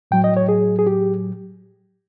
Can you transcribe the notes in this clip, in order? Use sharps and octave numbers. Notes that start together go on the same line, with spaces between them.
A2 F#3 G5
D#5
C#5
G#4
G#4
G4